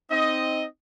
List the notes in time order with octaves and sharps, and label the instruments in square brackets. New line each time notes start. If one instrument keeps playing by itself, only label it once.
[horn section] C4 D#4 D#5